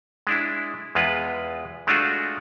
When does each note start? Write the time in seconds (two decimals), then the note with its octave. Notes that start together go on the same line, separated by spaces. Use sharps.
0.27 G#3 D4 E4
0.95 E2 G#3 F4 B4
1.87 G#3 A3 D4 F4 F#4